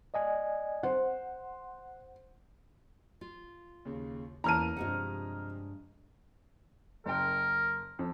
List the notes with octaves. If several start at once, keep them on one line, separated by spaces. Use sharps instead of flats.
D5 D#5 G#5
C5 F#5
F4
D#2 C#3
E2 E3 A#3 C#4 A5 A#5 F6 D#7
G2 C3 F3 G#3 F#5
F#1 A#4 G5
F2